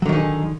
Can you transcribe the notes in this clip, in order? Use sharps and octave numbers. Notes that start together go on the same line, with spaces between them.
D3 D#3 F#3 D#4 G#4